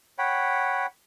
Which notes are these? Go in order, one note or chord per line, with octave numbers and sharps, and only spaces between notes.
C#5 F#5 G5 B5